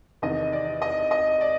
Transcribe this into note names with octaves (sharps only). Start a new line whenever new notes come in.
E2 C3 D#3 D#5
D5
D#5
D#5
D5